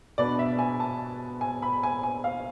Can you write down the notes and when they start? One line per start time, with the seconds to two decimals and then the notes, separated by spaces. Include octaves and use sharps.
0.18 B2 B3 D4 D5
0.39 E5
0.59 G#5
0.80 A5
1.41 G#5
1.62 B5
1.83 G#5
2.03 G#5
2.24 F5